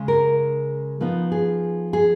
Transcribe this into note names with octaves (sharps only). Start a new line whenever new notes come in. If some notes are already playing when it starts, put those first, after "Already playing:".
Already playing: C#3 G#3 C#4
A#4
F3 B3 D#4
G#4
G#4